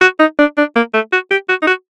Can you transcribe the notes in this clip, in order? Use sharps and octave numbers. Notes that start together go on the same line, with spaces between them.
F#4
D#4
D4
D4
A#3
A3
F#4
G4
F#4
D#4
F#4